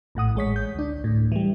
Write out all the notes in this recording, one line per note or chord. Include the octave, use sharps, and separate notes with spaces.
A#1 A2 F#5 D#6
A1 G#3 C#5 B6
G6
D2 D4
D2 A2
E3 G3